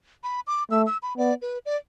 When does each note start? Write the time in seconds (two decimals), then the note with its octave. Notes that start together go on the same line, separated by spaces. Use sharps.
0.24 B5
0.47 D6
0.71 A3 E6
0.86 E6
1.03 B5
1.18 B3 D5
1.42 B4
1.66 D5